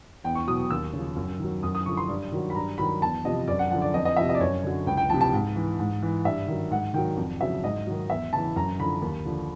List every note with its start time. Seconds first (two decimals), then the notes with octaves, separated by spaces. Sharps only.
0.24 E2 G5
0.35 C#6
0.47 B2 F#3 D#6
0.71 D#2 E6
0.93 C#3 F3
1.16 F#2
1.39 D#3 F#3
1.63 F#2 D#6
1.75 D#6
1.86 D3 F3 C#6
1.97 C6
2.09 G2
2.32 D#3 F#3
2.50 B5
2.55 G2 A#5
2.78 D#3 F#3 B5
3.02 E2 A5
3.25 C3 F3 D#5
3.47 F#2 D5
3.59 F#5
3.71 D3 F3 F#5
3.82 D5
3.94 F2 D#5
4.05 D#5
4.16 C3 F3 E5
4.29 D#5
4.35 D5
4.40 F#2 C#5
4.63 D3 F#3
4.87 C#2 G5
4.97 G5
5.10 C3 F3 A5
5.21 A5
5.33 G#2
5.56 E3
5.79 G#2
6.03 E3
6.25 G2 E5
6.48 D#3 F#3
6.71 G#2 F#5
6.94 D#3 F#3 G5
7.17 F2
7.41 C#3 F#3 E5
7.64 G#2 D#5
7.87 D#3 F#3
8.10 E2 E5
8.33 C#3 E3 A5
8.56 F#2 A#5
8.79 D3 F3 B5
9.02 D#2
9.25 D3 F3